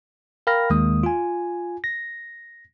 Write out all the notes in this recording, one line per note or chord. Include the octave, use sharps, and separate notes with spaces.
A#4 F5 G5 B5 F6 A#6
D#2 D#3 G#3 A#3 D#6
F4 G#5
A#6